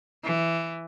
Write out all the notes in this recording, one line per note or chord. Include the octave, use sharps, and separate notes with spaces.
E3